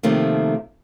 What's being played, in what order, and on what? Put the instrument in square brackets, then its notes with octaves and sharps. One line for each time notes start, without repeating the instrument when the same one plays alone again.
[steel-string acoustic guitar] C3 D#3 F3 A3 A#3